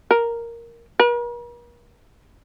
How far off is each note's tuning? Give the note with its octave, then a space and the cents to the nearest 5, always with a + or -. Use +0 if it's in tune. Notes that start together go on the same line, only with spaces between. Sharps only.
A#4 +0
A#4 +45